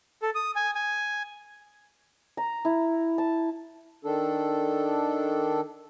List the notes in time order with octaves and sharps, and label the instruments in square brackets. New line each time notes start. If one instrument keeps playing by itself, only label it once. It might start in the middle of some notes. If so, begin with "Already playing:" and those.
[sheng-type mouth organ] A4
D#6
G#5
G#5
[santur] A#5
E4
A5
[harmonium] D#3 D4 A4